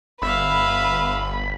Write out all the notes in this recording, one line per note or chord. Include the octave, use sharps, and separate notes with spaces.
G1 B4 E5 F5 B5